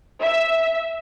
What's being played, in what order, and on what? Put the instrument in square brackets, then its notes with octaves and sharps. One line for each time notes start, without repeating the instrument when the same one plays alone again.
[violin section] E5